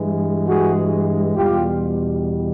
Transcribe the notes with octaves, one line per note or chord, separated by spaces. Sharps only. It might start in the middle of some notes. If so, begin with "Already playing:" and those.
Already playing: G2 E3 G#3
F#4 G#4
E2 B2 G3 F4 G4